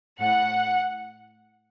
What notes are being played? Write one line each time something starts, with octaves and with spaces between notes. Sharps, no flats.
A2 F#5